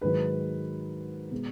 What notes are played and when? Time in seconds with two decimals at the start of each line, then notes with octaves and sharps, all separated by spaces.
0.01 G#2 D#3 F#3 B4
1.31 B2 G#3